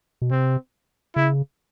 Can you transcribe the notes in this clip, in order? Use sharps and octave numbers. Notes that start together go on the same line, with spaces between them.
B2
C3 C4
C#3 E4